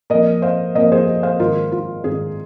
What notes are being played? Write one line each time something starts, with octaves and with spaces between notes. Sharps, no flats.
A#2 F3 A#4 D#5
C5 F5
A#2 F3 A#4 D#5
G#4 C5
G#4
C5 F5
G#2 D#3 F4 A#4
F4
G#2 D#3 G#4